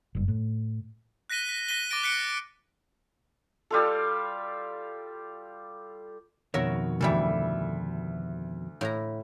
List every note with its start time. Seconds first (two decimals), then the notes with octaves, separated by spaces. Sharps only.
0.15 F#1 G2
0.28 A2
1.30 F#6 A#6 B6 D#7 G7
1.49 B6
1.68 A#6 B6 D#7 G7
1.91 D6 A6 A#6 D7
2.03 F#6 B6 C#7 D7
3.71 G3 F4 A4
6.54 F2 B2 D#3 F#4 A#4 C#5 E5
7.01 D2 E3 G3 A4 E5
8.81 A2 E4 A#5